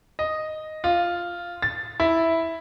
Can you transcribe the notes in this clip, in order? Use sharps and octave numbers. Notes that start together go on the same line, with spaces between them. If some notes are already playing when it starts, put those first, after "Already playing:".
D#5
F4
A6
E4